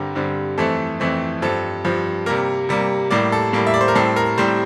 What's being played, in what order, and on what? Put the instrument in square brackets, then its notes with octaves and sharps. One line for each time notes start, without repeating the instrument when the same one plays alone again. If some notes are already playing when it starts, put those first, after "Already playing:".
Already playing: [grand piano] G2 D3 G3 C4 A#4
G2 D3 G3 C4
F2 E3 A3 C4 A4
F2 E3 A3 C4
G2 F3 C4 A4
G2 F3 C4
C3 G3 A#3 A#4
C3 G3 A#3
A2 G3 A#3 D5
A4
A2 G3 A#3
E5
D5
C5
A#4
A2 G3 C4 A4
A#4
A2 G3 C4 C5